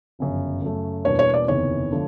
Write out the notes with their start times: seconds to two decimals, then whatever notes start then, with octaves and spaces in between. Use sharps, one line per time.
0.19 G1 F#2 C#3 F3
0.62 F#2 C#3 F#3 A3
1.05 E2 B2 G3 A#3 D4 C#5
1.19 C#5
1.34 D5
1.48 F#1 E2 C3 D#3 C#5
1.92 D3 F3 A3